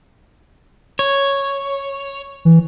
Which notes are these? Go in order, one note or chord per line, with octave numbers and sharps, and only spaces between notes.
C#5
E3